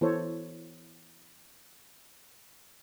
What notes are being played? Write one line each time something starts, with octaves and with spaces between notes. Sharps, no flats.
E3 B3 E4 A4 C5 C#5